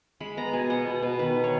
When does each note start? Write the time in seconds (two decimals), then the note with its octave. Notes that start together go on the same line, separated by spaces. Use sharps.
0.20 G#3 B5
0.37 B3 A#5
0.53 B2 G#5
0.70 B3 F#5
0.86 B2
1.03 B2
1.19 D#3 B4
1.36 D#3
1.44 C#5